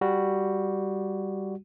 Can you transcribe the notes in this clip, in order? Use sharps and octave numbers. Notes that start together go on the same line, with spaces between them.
G3 F#4